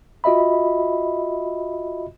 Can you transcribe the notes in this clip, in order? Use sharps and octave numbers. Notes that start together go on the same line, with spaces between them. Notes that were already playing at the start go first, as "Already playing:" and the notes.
F4 F#4 D#5 E5 B5